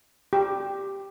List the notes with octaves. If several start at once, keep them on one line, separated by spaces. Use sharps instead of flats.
G4